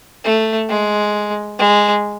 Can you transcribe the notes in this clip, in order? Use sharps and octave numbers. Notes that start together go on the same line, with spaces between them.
A3
G#3
G#3